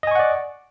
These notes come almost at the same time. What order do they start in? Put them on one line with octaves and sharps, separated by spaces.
D#5 G#5 C#6 F#5 D5